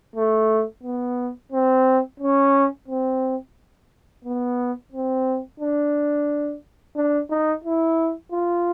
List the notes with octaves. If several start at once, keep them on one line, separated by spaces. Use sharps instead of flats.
A3
B3
C4
C#4
C4
B3
C4
D4
D4
D#4
E4
F4